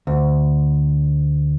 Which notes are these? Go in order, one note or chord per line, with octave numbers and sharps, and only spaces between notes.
D2